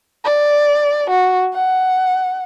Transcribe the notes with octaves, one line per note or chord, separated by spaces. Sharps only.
D5
F#4
F#5